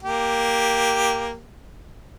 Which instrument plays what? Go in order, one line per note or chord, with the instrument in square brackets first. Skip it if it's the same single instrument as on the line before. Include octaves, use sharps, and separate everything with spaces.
[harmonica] A#3 G4